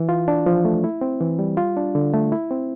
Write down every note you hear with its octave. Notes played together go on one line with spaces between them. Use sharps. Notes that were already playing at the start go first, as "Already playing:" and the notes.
Already playing: E3
F4
D4
F3
A3
E4
C4
E3
G3
F4
D4
D3
A3
E4
C4